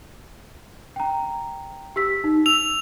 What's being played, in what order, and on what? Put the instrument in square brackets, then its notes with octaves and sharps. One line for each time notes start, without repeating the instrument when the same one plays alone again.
[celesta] G5 A#5
G4 E6 B6
D#4
[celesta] E6 [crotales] F7